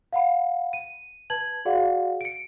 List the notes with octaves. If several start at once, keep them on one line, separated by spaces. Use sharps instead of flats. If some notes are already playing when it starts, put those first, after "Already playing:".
F5 F#5 B5
D#7
B4 A5 G#6 F#7
F#4 G#4 D5 F5 F#5
C#7 D7